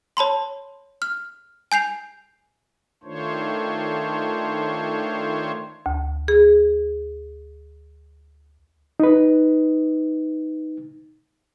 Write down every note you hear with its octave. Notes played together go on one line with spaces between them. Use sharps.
C#5 A5 B5 C6
F6
G#5 G6 C7 F7
D#3 A3 D4 F4 C5 C#5
D2
G#4
D#4 B4